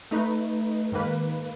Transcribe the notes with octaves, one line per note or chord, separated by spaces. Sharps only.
A3 D#4 B4
G#2 D#3 A#3 B4